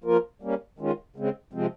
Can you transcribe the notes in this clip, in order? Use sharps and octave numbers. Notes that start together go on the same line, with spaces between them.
F3 A#3 F4 A#4
G3 A#3 C#4
D#3 G#3 C#4 F4
C#3 G#3 C4
C3 F3 G#3 C4